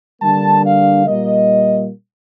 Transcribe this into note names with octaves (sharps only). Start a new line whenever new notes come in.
D3 G3 A#3 D4 A5
F5
A#2 G3 A#3 D#5